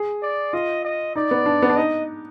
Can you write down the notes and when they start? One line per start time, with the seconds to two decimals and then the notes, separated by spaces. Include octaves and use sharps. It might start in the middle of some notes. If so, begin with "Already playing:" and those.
Already playing: G#4
0.22 D5
0.53 F4 D#5
0.85 D#5
1.16 D#4 D5
1.31 B3
1.46 D4
1.62 B3
1.69 D4
1.77 D#4 D#5